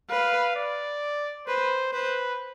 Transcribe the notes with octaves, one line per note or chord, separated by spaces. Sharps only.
B4 F5
D5
B4 C5
B4 C5